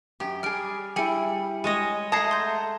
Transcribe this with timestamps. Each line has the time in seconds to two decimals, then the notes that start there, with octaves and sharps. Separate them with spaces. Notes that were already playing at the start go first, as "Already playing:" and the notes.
0.20 F#2 G4
0.43 G3 G#4 F6 D7
0.96 G3 E4 G#4 G#5 C#7
1.64 G#3 C#5 D#5 G#5
2.12 A3 F#5 A5 A#5 D#6 G#6 C7
2.31 C6 G6